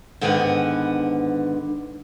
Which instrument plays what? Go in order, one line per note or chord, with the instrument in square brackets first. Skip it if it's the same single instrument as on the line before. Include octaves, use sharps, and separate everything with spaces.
[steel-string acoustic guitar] G#2 D3 D#3 B3 B4 F#5